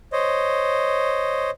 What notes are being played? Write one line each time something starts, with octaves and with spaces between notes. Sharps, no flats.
C5 C#5 D#5